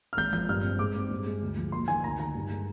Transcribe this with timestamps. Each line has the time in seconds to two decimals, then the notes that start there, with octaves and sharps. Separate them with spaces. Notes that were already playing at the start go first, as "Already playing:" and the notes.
0.13 F6
0.17 G#1 G6
0.33 F3 G6
0.49 G2 F6
0.64 C4
0.79 G#2 D6
0.96 C4
1.11 G2
1.27 G#3
1.42 D2
1.58 F3
1.72 A#1 C6
1.88 D#3 G#5
2.03 D2 A#5
2.20 D#3 A#5
2.35 G2
2.51 G#3